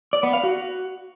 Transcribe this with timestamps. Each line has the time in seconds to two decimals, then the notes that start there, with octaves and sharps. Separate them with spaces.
0.13 D5
0.23 B3
0.33 F5
0.43 F#4